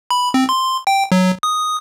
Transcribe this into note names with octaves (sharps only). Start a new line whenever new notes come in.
B5
C4
C6
G5
F#3
D#6